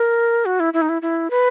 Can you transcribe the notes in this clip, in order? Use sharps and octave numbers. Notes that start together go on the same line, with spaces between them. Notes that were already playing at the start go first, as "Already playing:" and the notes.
Already playing: A#4
F#4
E4
E4
D#4
E4
E4
B4